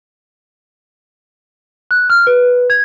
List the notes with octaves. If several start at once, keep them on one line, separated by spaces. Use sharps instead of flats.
F#6
F6
B4
G#6